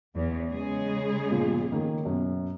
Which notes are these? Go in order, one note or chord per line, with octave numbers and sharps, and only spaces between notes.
E2
C#3 G#3 G#4
G1 A#2 F3
D#3 A#3
F#2 B2